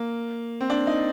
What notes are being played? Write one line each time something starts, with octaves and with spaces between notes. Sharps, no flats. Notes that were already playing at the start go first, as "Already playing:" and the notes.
Already playing: A#3
C4
D4
D#4